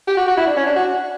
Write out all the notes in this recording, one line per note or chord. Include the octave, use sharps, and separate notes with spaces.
G4
F#4
F#4
E4
D4
C#4
D4
F#4